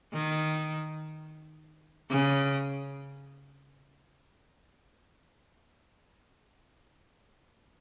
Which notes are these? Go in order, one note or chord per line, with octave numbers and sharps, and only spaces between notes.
D#3
C#3